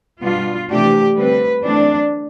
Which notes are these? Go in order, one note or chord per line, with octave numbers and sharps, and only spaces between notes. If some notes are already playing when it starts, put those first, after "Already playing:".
B2 G3 B3 D4 F4
C3 E3 A3 D4 G4
D3 G3 C4 B4
E3 A3 C4 D4